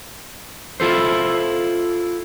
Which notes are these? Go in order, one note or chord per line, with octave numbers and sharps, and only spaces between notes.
E4 F4 A4 C5